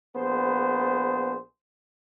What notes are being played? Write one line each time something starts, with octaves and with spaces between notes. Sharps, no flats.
A#1 B3 G#4 C5